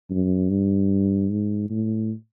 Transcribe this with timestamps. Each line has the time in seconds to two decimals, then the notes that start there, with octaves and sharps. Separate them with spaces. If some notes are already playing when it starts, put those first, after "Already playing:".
0.10 F#2
0.50 G2
1.30 G#2
1.70 A2